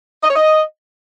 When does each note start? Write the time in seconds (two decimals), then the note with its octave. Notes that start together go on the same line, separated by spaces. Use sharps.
0.24 D#5
0.30 C#5
0.36 D#5